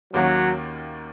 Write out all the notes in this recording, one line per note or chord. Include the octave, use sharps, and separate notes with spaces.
D#2 D#3 F#3 A#3 C#4 F#4